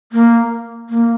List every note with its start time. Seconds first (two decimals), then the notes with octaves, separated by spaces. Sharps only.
0.12 A#3
0.90 A#3